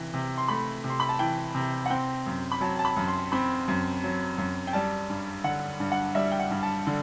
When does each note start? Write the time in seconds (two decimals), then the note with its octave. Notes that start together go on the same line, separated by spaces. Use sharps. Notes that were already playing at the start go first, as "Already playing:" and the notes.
Already playing: C3 E3
0.14 C3
0.38 C6
0.48 A3 B5
0.84 C3
0.90 C6
1.00 B5
1.09 A5
1.19 E3 G5
1.55 C3
1.86 F#5
1.90 C4 G5
2.26 F#2
2.52 B5
2.61 F#3 A5
2.79 A5
2.85 B5
2.96 F#2
3.08 C6
3.32 C4 B5
3.68 F#2
4.03 F#3
4.38 F#2
4.67 G5
4.73 G3 A5
5.10 G2
5.44 D3 F#5
5.80 G2
5.92 F#5
6.15 G3 E5
6.32 G5
6.39 F#5
6.51 G2
6.63 A5
6.87 D3